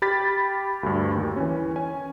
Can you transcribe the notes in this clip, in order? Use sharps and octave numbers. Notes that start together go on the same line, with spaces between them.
G4 B5 F6 A6 B6
D2 G2
D#2
E3 C#4
C#4 G#5